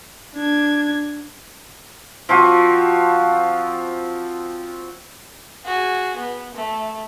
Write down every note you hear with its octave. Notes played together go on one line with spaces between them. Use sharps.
D4 G#6
F3 C4 F4 F#4
F#4 G#4
B3
A3